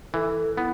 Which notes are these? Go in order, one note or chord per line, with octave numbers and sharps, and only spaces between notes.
E3 A4
B3 E4